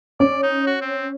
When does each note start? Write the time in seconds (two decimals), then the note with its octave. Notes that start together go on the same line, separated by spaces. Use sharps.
0.20 C#4 D5
0.43 D#4
0.67 F#4
0.81 C4